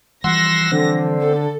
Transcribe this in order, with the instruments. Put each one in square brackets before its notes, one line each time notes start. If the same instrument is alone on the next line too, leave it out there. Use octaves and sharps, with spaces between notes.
[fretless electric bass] E3 F3 G3 [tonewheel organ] F#5 C6 E6 [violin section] A#6
[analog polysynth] D3 [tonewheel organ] C4
[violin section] A4